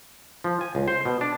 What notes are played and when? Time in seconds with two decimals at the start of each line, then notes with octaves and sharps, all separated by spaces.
0.44 F3
0.61 G#5
0.75 C#2
0.88 C5
1.05 B2
1.21 D4